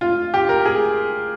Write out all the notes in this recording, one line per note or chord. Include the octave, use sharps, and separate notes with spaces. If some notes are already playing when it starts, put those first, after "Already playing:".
F4
G4
A#4
G#4